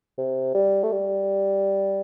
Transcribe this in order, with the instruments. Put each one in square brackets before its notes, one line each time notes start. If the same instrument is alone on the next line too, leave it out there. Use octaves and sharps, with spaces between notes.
[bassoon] C3
G3
A3
G3